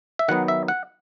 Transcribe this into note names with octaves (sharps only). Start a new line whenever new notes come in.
E5
D#3 F#3 B3 D#4 F#5
E5
F#5